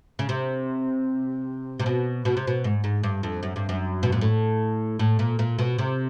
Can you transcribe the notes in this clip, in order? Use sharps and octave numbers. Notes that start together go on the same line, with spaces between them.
C#3
C3
C3
B2
B2
C3
B2
G#2
G#2
G2
F2
F#2
G2
F#2
B2
A#2
A2
A2
A#2
A#2
B2
C3